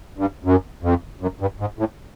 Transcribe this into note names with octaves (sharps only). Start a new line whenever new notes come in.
G2
F#2
F2
F#2
G2
G#2
A2